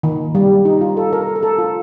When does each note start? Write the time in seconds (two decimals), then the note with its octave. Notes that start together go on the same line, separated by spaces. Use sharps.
0.03 D#3
0.35 G3
0.65 D#4
0.81 F4
0.97 A4
1.13 A#4
1.27 A4
1.36 A#4
1.43 A4
1.58 F4